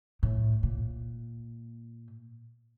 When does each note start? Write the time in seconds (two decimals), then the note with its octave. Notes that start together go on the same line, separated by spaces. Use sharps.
0.23 A2
0.63 A#2